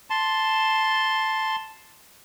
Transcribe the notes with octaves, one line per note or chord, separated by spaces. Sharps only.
A5 C6